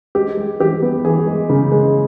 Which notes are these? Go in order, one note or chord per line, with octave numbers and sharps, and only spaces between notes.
G#3 G4
G#3
E3 G4
B3
E3 G#4
G#3
C#3
G#3